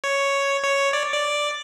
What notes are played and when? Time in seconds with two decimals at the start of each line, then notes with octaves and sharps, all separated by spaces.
0.04 C#5
0.63 C#5
0.93 D5
1.13 D5